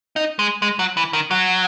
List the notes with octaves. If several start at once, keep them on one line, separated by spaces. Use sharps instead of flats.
D#4
G#3
G#3
F#3
E3
D#3
F#3